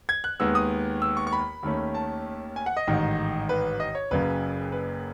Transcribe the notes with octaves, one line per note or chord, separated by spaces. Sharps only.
G#6
F#6
D#2 D#3 G#3 B3 E6
D#6
E6
C#6
C#6
B5
D#2 D#3 A3 C#4
A5
G#5
F#5
D#5
A1 G#2 D#3
B4
D#5
C#5
F#1 F#2 C#3 B4
B4